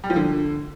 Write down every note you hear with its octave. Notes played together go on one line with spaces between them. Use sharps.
G3
F3
D3